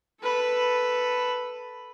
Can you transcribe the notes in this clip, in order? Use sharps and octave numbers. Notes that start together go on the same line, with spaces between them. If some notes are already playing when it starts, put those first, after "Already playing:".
A4 B4